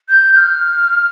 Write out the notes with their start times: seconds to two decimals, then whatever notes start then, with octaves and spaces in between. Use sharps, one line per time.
0.09 G6
0.33 G6
0.37 F6